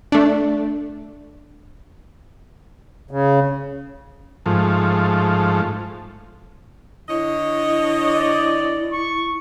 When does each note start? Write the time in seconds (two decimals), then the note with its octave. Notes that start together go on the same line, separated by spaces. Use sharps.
0.12 A3 D4
3.11 C#3
4.46 G#2 F3 A3
7.09 D3 E4 C#5 D#5
8.08 D5
8.92 C#6